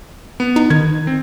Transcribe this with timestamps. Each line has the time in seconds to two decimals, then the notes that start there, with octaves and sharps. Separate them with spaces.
0.40 B3
0.56 D#4
0.70 D#3 G#6
1.07 C4